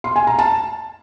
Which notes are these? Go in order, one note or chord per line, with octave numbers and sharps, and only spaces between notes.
C6
G#5
A#5
A5